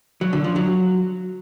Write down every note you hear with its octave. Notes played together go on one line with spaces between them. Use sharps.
F#3
D3
F3
F#3